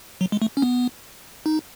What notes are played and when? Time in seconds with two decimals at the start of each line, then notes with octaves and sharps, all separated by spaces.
0.21 F#3
0.32 G#3
0.42 A3
0.57 C#4
0.62 B3
1.46 D#4